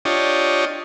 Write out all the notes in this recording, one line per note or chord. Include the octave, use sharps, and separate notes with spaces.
D4 F4 G4 C#5 D#5